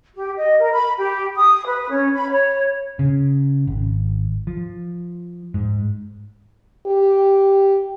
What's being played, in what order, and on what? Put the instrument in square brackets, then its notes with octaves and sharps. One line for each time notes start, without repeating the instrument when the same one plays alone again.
[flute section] G4
D#5
A#4
B5
G4
D#6
B4
C#4
B5
C#5
[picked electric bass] C#3
G#1
F3
G#2
[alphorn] G4